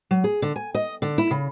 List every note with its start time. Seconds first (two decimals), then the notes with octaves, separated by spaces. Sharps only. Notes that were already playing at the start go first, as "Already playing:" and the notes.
0.11 F#3
0.24 G#4
0.42 D3
0.56 G#5
0.75 D#5
1.02 D3
1.18 E4
1.31 C#3